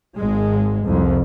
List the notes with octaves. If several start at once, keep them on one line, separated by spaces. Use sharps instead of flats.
G#1 G#2 G#3
C2 F2